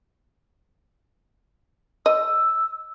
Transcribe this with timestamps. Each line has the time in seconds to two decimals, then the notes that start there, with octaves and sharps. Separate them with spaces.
2.06 D#5 E6